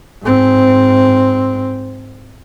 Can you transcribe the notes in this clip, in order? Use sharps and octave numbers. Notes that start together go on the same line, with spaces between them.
G#2 C4